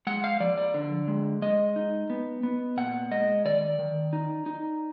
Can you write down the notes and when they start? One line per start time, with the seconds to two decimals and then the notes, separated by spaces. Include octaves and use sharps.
0.07 G#3 F#5
0.24 F5
0.40 F3 D5
0.57 D5
0.74 D3
1.08 G#3
1.42 G#3 D#5
1.76 D#4
2.10 B3
2.43 B3
2.77 A#2 F#5
3.11 G#3 D#5
3.45 D#3 D5
3.79 D#3
4.13 D#4
4.46 D#4